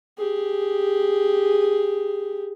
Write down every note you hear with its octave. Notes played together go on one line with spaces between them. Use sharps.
G4 G#4